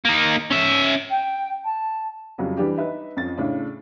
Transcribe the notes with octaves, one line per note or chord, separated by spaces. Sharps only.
A#3 D#4
C#4 E5
G5
A5
F2 C#3 F#3 G3
E3 G3 D4 G4
D#4 B4 E5
F2 C#4 A6
A2 C#3 D4